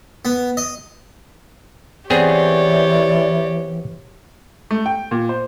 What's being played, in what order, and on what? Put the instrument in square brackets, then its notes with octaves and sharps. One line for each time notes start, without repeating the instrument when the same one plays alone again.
[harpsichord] B3
D#5
[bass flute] E3 [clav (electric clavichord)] B3 C4 G#4 [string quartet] G4 C#5 [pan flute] D5
[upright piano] A3
G5
A#2
C5